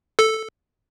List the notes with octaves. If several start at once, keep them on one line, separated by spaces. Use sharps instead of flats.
A4